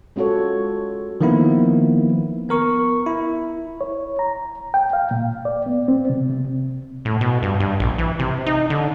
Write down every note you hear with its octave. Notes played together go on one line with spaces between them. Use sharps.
G#3 C#4 F4 F#4 A4 C#5
D#3 F3 A#3 B3 E4
B3 A#4 C#6
E4
C#5
A#5
G5
F5
A#2
D5
B3
C4
C3
C3
A2
B2
G2
G2
A#1
E3
C3
D#4
D3